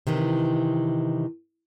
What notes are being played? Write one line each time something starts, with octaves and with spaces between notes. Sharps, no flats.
C3 D#3 E3